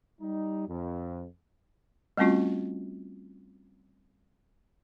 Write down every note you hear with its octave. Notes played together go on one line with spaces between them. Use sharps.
G3 D#4
F2
G3 A3 C4 C#4 F4 F#4